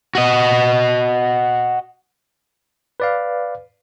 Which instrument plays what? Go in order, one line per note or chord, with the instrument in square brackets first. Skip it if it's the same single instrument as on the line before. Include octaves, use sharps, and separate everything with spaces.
[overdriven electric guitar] F#4 D#5
[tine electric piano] B4 D5 F5